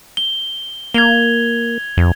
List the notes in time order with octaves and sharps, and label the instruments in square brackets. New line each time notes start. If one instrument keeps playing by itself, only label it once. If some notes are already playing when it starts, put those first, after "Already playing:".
[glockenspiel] G7
[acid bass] A#3 [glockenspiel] G#6 F7 G7
[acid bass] F2